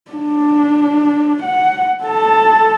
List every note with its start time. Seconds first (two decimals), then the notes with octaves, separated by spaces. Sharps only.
0.12 D4
1.43 F#5
2.04 A4 A5